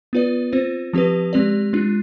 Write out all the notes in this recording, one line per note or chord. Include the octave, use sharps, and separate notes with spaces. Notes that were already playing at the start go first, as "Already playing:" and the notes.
B3 F4 B4 D5
C4 F4 C5
F3 C4 G4 B4
G#3 C4 G4 D5
G#3 D4 F4